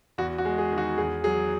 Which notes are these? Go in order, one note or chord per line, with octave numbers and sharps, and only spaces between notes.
E2 F#4
F#4
G#3
G#4
D#3
F#4
E2 G#4
F#3 G#4